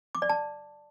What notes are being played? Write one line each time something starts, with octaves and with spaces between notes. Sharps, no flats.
D6
D5
A5